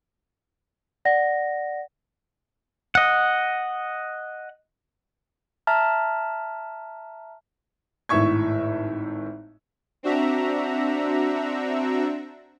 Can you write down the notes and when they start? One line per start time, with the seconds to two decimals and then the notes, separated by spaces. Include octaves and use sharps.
1.05 D5 F#5 A#6
2.95 D#5 F#5
5.67 E5 A5 A#5 F6
8.09 G#1 A2 E5 C#6 G#6
10.03 C4 D4 F#4 E5 A#5